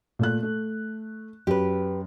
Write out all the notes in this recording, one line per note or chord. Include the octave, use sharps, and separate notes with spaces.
A#2 A3 F#6
A3
F#2 G4 B4